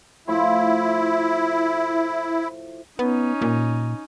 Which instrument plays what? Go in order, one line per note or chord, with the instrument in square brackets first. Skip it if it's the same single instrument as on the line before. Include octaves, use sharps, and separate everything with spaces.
[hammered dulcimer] A2 F3 C6 [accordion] E4
[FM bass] B3 [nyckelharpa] C#4 D#4
[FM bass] A#2